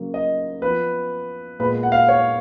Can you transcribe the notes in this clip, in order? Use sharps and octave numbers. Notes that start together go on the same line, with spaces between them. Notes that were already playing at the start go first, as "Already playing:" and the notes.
Already playing: C#3 F#3 A#3
D#5
F3 B3 B4
A#2 G#3 B3 B4
F#5
F5
C#5